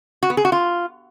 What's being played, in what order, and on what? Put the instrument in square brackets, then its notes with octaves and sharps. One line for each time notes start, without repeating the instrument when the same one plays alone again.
[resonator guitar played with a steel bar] F#4
B3
G#4
F#4
F4